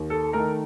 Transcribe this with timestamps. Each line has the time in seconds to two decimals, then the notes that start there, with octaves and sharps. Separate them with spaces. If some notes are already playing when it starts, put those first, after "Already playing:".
Already playing: D#2
0.10 A4
0.33 D#3 A3 A#4